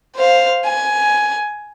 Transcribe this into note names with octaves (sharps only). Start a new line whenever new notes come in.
C5 F5
G#5